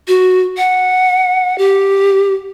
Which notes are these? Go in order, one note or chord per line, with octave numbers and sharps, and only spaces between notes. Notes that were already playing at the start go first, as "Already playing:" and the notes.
F#4
F#5
G4